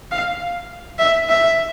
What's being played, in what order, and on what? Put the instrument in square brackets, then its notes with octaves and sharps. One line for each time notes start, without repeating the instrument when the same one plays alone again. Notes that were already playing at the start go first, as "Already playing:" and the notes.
[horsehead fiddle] F5
E5
E5